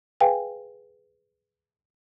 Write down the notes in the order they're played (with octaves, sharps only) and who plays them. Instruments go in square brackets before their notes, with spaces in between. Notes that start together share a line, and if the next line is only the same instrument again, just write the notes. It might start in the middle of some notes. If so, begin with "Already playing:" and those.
[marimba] G#4 B4 F5 G5 G#5